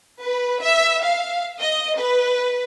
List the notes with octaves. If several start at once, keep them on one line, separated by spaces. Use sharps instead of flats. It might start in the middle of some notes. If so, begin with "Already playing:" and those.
B4
E5
F5
D#5
B4